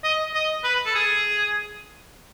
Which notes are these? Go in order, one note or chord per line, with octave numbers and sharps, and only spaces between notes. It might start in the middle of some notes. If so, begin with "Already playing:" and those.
D#5
D#5
B4
A4
G#4